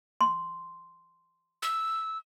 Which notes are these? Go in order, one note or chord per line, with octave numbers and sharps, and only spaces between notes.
C6
E6